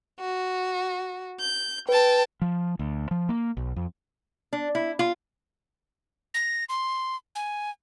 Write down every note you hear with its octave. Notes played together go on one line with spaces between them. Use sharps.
F#4
G6
B4 G5 A5
F3
D2
F3
A#3
B1
F2
D4
E4
F4
A#6
C6
G#5